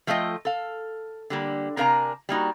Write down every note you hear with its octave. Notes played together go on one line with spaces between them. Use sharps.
F3 A3 F4 G4 D#5 G5
A4 F5
D3 G3 A#3
C3 D4 A#4 F5 G#5 A#5
G3 A#3 D#4 F#4